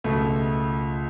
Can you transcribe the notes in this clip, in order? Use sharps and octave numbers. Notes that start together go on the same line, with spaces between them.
C#2 B2 A3